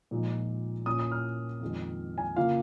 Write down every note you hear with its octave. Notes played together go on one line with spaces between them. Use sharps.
A#2 F3 G#3 D#4
A#2 A#3 C#4 F4 D#6
D#6
F6
F2 D#3 G#3
G#5
C#3 A#3 F4 F5